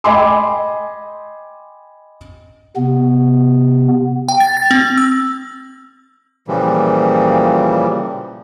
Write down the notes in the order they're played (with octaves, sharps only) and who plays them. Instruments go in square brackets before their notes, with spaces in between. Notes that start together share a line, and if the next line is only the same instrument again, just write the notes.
[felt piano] D#5 G5 G#5 B5 C6 D6
[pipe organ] C3 B3
[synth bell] G5
A6
A6
C4
E6
[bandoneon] A#2 C#3 E3 F3 G3